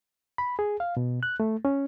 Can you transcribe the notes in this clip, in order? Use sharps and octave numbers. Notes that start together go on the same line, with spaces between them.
B5
G#4
F5
B2
F#6
A3
C#4